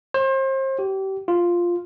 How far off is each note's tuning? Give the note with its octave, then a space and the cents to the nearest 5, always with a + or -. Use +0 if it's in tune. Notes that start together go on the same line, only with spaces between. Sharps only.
C5 +35
G4 -30
F4 +0